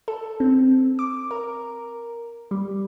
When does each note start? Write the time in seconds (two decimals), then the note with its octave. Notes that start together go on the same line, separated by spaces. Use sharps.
0.08 A4
0.40 C4
0.99 D6
1.31 A#4
2.51 G3